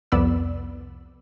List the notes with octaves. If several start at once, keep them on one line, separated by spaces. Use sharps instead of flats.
C2 F2 B3 D5 B5 E6